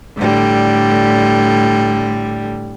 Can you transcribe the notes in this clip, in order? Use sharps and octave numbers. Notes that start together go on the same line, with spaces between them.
A2 D3 G3